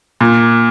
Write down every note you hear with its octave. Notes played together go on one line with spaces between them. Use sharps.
A#2